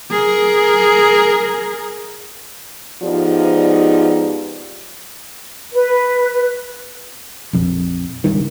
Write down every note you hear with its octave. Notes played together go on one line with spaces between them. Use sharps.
G#4 A#4
G#2 F3 B3 D#4 G4 D5
B4
A#1 F2
C#2 G2 D#3